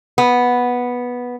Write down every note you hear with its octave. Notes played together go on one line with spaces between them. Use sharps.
B3